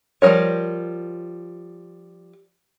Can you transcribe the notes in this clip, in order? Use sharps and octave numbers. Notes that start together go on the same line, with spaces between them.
F3 G3 G#3 A#4 C#5